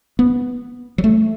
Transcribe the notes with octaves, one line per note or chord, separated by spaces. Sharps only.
B3
F#3
A3